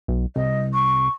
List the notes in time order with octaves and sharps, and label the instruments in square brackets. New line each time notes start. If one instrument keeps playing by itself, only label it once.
[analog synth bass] B1
[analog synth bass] C2 [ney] D#5
[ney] C#6